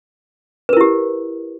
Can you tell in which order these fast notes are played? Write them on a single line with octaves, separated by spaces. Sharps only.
B4 A#4 E4 G4